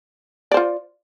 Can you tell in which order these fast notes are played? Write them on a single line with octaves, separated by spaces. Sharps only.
D5 C5 F4